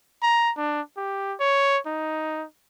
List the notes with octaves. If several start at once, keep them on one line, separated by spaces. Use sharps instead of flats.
A#5
D4
G4
C#5
D#4